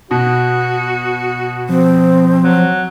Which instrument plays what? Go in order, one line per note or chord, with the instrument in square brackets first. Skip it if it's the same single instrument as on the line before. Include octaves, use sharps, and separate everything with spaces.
[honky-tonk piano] B2 [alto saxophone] F#4
[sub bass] F3 [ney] C4
[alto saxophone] F#3